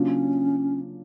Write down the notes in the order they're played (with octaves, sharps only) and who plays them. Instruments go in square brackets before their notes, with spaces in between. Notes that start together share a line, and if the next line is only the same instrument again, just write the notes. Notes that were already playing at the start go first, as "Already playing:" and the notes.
Already playing: [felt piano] C#3 F#3 A#3 D4 F4 [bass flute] C#4